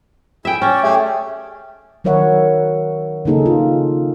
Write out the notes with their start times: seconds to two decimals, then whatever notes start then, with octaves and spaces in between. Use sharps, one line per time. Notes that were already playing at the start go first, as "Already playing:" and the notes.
0.45 E4 G#4 E5 G5
0.62 C#4 C#5 D5 G5
0.83 A3 G4 G#4 E5 G5
2.04 D#3 F#3 A#4 C#5 E5 F#5
3.25 C#3 F#3 A#3 D#4 G#4 A4
3.46 F4